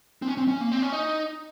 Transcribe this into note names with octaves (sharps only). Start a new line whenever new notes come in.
C4
C#4
C4
C#4
A#3
C4
C#4
D#4